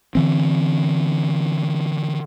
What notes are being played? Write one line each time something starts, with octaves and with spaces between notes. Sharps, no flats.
D3 E3 C4